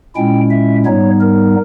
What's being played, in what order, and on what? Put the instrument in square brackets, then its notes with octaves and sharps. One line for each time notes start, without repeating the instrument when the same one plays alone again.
[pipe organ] A#2 G#3 C#4 E4 G5
E5
G#2 G3 B3 D#4 C#5
A#4